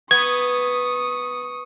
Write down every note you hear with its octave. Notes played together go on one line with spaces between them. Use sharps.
B3 C#6 D#6 G#6